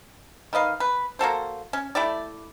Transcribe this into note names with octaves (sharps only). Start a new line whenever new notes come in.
D#3 B4 D#5 F5
B4
A#3 F#4 A4 C5
C#4
A3 E4 G4 D5